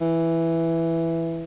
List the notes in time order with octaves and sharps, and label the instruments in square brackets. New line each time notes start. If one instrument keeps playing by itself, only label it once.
[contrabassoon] E3